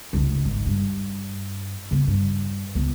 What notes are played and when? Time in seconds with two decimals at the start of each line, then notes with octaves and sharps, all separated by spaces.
0.13 F1 C#2
0.45 G#1
0.66 G2
1.91 C#3 B3
2.07 G2
2.75 C#2 B3